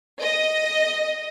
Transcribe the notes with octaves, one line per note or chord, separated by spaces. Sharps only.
D#5